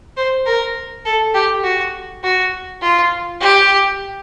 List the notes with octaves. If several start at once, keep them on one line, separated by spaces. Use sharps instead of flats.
C5
A#4
A4
G4
F#4
F#4
F4
G4